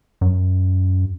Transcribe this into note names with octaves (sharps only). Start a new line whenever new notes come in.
F#2